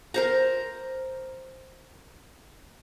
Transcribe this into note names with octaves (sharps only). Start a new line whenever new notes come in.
A#4 C5 A#5